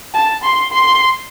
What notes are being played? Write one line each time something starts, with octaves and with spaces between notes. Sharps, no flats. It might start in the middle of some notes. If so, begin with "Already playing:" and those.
A5
C6
C6